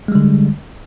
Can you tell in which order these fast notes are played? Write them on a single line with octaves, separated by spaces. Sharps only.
G#3 G3 D3